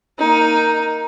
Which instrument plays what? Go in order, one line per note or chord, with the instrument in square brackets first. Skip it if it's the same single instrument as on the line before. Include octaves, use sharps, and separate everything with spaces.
[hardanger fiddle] A#3 D#4